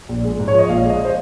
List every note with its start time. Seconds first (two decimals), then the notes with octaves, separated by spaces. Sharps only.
0.09 A#1
0.24 G#3
0.39 G#2
0.48 C#5
0.54 F3 D#5
0.69 A#1 F5
0.85 G#3 D#5
1.05 C5